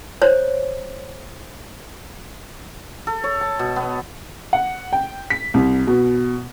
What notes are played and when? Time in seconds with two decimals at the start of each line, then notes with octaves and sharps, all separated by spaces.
0.22 C5 C#5
3.07 A4
3.24 C#5
3.41 A5
3.59 B2
3.76 B3
4.53 F#5
4.93 G5
5.30 B6
5.54 C2
5.87 B2